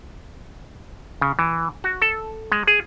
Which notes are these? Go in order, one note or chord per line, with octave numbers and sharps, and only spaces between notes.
C#3
E3
F#4
A4
G#3
G#4